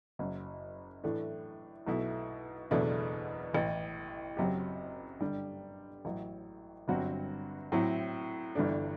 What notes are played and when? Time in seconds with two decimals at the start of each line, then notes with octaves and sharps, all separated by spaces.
0.19 F#1 F#2 F#3
1.04 A2 E3 A3 D4
1.87 B1 B2 A3 E4
2.71 F#1 E2 B2 A3 D4
3.53 A1 A2 E3
4.37 F#1 F#2 F#3 C4 G4
5.20 G2 D3 G3
6.05 A1 A2 F#3
6.88 G1 G2 F#3 C4 F#4
7.72 A2 F#3 C4 E4
8.55 G1 G2 E3 A3 D4